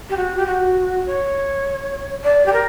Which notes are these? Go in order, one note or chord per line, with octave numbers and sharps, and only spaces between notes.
G4
F#4
G4
F#4
C#5
D5
G4
A#4